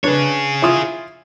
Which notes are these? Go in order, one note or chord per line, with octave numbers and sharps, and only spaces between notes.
D4 G#4 B4 C#5
E4 F4 D#6